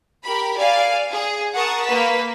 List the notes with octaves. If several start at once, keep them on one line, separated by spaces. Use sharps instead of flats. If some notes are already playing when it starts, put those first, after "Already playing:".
G4 A#4 B5
D5 F5 G#5
G#4
A#4 F#5 A5 C#6 D#6
A#3 B4 B6